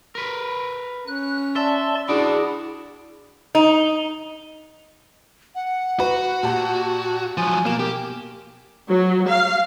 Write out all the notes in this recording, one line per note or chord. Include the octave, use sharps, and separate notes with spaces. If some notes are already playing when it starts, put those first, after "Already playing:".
A#4 B4
C#4 F#6
D5 E5 A5 C6
D4 E4 F#4 G#4 D5
D#4
F#5
F#4 B4
A#2 G4 A5
F3 F#3 G#5
B2 A#3 E7
G4 A#4
F#3
F5